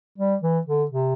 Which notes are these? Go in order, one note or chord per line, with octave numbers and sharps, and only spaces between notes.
G3
E3
D3
C3